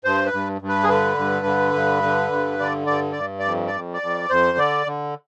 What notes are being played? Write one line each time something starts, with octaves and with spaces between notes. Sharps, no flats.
G2 C5
B4
G2
G2
B4
G#4
D3 B4
G2
D3
G2
D3
G2
D3 D5
G2 D5
G2 D5
D5
F2
D5
F2
D5
F2
F2 C5
D3 D5
D3